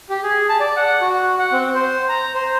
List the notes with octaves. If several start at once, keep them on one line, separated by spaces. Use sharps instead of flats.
G4
G#4
A5
D5
F#5
F#4
F#5
C4
C5
A#5
C5